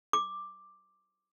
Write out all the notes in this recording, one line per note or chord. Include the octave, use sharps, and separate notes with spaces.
D6